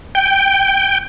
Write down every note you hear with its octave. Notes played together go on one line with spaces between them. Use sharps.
G5